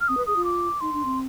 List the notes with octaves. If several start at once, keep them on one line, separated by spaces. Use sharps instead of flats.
F6
C4 D#6
B4
G#4 D#6
F4
D6
D#4 C6
D4
C4